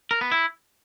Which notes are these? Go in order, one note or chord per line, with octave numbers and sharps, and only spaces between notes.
A#4
B3
E4